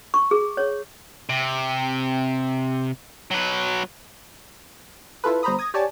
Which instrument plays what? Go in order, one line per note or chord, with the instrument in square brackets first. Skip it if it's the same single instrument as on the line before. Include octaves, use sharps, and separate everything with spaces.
[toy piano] C#6
G#4
C#5
[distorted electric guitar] C3
F#3 B4
[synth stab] E4 F4 A4 B4
G1 C5 A#5 B5 D#6
D#6 G#6 A#6
G4 C#5 D5 G#5 A5